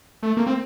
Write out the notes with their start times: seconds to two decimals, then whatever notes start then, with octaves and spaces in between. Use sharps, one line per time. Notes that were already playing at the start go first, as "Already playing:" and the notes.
0.23 A3
0.37 A#3
0.47 C4